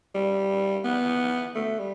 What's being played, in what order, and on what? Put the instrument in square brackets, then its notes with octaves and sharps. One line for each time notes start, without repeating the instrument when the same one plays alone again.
[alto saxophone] G3
B3
A3
G3